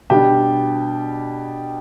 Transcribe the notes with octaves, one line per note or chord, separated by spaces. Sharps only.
B2 G3 D4 G4